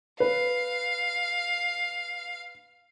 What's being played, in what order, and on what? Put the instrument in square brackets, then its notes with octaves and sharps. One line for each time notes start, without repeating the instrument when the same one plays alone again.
[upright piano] B4 [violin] F5